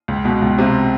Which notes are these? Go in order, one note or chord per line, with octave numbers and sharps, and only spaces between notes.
C#2
B2
C#2
C3